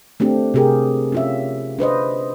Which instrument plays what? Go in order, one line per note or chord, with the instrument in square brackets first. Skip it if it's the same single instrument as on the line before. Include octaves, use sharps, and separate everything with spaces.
[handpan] A3 C4 D4 G4
C3 C4 G4 G#4 A#4
C#4 F4 E5
D4 B4 C5 D#5